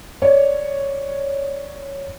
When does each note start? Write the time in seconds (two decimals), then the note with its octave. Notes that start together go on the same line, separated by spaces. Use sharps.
0.22 C#5 D5